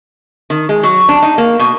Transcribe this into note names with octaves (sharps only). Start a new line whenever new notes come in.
D#3
G#3
F#3
D4
D#4
A#3
B2